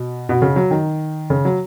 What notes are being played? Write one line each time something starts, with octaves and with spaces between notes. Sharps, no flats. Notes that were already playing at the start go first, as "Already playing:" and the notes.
Already playing: B2
B2
C#3
F#3
D#3
C#3
F#3